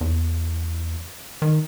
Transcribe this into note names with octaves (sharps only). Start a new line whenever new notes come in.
E2
D#3